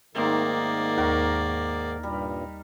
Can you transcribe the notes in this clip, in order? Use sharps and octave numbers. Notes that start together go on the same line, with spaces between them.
G#2 D#3 A3 A#3 C4 D#4 D5
D#2 A#4 C#6
G2 A#2 G3